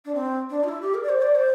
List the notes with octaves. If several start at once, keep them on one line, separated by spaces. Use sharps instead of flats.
D4
C4
D4
F4
E4
G4
A#4
D5
C5
D5
C5